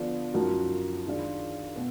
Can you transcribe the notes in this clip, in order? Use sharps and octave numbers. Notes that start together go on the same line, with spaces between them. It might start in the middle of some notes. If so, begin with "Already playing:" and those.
Already playing: D3 F3 B3 D4 F4
F#2 F3 A#3 D#4 F#4
D#3 G#3 D4 F4
B2